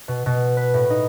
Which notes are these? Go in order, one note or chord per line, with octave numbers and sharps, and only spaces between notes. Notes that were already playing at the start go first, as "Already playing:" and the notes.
B2
B2
B4
A2
D#4